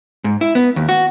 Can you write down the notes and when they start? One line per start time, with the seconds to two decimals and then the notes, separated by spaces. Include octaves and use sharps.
0.24 G#2
0.41 E4
0.55 B3
0.76 D#2
0.89 F#4